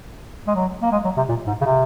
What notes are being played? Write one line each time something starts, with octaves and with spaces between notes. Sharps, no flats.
G#3
F#3
A#3
G#3
F#3
C3
A#2
G#2
C#3
C3